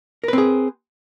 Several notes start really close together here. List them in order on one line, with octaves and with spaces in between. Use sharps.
A#4 B4 C4 G#4